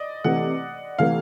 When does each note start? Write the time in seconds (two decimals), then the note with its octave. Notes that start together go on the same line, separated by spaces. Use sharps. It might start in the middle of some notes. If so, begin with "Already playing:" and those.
Already playing: D5 D#5
0.24 C3 E3 A3 F#5
0.99 C3 E3 A3 F5